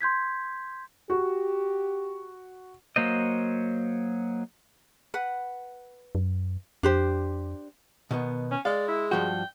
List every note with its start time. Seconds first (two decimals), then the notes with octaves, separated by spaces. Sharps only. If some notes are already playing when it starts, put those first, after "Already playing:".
0.01 C6 G6 G#6 B6
1.10 F#4 G4
2.96 F#3 A#3 C5 D#5
5.14 B4 F#5
6.15 F#2
6.83 F2 D4 G4 C5
8.11 B2 D#3 B3
8.51 C#4
8.65 G#3 D5 F5
8.88 E4
9.11 G2 F3 F#4 G5